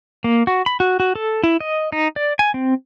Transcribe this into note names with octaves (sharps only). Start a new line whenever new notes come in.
A#3
F#4
B5
F#4
F#4
A4
E4
D#5
D#4
D5
G#5
C4